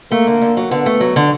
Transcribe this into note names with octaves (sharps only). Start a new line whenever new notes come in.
A3 A#3
D3
D3
F#3
D3 B3
A3
F#3
D3